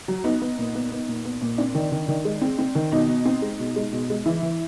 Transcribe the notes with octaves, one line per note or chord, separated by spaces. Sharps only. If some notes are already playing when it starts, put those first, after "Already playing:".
F#3
B3 D#4
B3
A#2
B3
B3
A#2
B3
A#2
C4 D4
D#3
D#3
D#3
G#3
C4
C4
D#3
B2 D#4
B2
C4
G#3
B2
G#3
B2
G#3
E3 E4
E3